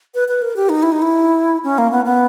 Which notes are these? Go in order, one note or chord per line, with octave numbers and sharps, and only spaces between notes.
B4
B4
A#4
G4
D#4
E4
D#4
E4
C#4
A#3
B3
B3